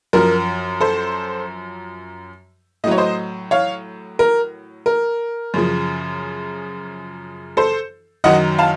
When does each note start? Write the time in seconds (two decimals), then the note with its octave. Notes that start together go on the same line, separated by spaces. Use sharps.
0.13 F#2 F3 A#4
0.80 A4 C5
2.84 A2 D#5
2.87 F#3 C#5
2.98 C5 D#5
3.51 C#5 F5
4.19 A#4
4.86 A#4
5.54 F#2 C#3 F3
7.57 A4 C5
8.24 F#2 D#3 F#3 D#5 F#5
8.59 F5 A5